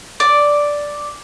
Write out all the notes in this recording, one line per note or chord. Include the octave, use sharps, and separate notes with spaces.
D5